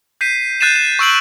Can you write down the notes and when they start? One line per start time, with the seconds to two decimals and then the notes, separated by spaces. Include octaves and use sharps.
0.21 G6 B6 C7 D#7
0.61 F#6 G6 A6 C7 D#7 E7
0.76 E7
0.99 C#6 E6 D7 F#7